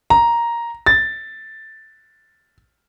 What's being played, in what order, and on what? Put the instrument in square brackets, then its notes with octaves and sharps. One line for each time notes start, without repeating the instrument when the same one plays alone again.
[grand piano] A#5
A6